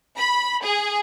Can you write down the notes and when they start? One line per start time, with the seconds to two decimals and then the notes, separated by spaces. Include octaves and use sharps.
0.17 B5
0.63 G#4